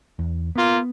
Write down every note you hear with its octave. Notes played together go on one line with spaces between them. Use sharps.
E2
A#3 B3 F4